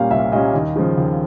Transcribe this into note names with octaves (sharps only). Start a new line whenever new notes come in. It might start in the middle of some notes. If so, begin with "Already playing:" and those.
Already playing: A#2 G3 A#3 C#4 F5 G5
C2 E5
A#2 G3 A#3 C#4 D#5
D#2
C#3 F3
D#2